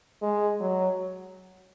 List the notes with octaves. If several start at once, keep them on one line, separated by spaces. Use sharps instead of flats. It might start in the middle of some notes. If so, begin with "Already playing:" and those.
G#3
F#3